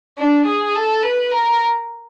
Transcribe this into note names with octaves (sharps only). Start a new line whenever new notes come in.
D4
G#4
A4
B4
A#4